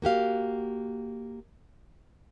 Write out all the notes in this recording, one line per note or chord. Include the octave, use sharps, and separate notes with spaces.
A#3 F#4 G4 F5